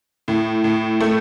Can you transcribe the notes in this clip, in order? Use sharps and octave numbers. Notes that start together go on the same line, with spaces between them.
A2
A2
A3